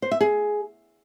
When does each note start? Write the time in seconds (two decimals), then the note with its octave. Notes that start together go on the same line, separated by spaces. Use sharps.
0.02 C5
0.11 E5
0.21 G#4